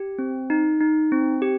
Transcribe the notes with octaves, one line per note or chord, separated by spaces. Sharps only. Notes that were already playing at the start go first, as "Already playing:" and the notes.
Already playing: G4
C4
D#4
D#4
C4
G4